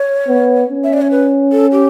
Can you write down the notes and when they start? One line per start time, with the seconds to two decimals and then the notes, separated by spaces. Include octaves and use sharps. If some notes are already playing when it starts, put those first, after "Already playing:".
Already playing: C#5
0.27 B3
0.70 C#4
0.84 E5
0.93 D5
1.02 C#5
1.11 B4
1.52 A4
1.72 G4